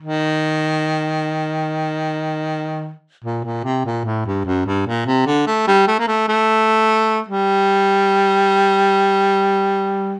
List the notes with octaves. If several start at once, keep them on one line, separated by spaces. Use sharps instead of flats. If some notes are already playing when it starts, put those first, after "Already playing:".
D#3
A#2
A#2
C3
A#2
A2
G2
F#2
G2
A#2
C3
D3
A3
G3
A3
A#3
A3
A3
G3